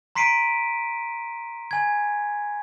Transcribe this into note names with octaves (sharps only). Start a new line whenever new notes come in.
A#5 C6 B6 C7 D7 D#7
G#5 G#6